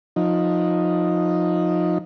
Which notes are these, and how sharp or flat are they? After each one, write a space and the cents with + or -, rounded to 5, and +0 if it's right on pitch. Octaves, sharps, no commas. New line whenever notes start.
F3 +20 D#4 +0